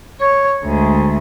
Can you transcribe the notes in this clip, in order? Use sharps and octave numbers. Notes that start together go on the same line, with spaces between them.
C#5
D2 G#3